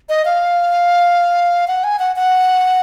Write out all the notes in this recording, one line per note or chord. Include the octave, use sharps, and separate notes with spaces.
D#5
F5
F#5
G#5
F#5
F#5